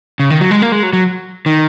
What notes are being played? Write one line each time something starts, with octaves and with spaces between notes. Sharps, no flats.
C#3
D#3
F#3
G#3
A#3
G#3
F#3
F#3
D#3